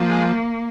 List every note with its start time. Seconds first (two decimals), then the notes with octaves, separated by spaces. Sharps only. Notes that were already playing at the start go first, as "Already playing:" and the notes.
Already playing: F3 A#3
0.10 G#3